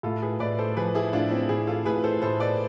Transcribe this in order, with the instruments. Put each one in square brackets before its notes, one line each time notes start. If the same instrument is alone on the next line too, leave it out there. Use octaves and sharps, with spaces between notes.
[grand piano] A2 [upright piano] F4 A4
[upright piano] G#4 B4
[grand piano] A2 [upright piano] B4 D5
[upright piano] A4 C5
[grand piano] F3 [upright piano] G#4 B4
[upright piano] E4 G#4
[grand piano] A2 [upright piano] D4 F4
[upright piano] C4 E4
[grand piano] A2 [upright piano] E4 G#4
[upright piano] F4 A4
[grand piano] A2 [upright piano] G#4 B4
[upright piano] A4 C5
[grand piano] A2 [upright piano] A4 C5
[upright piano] B4 D5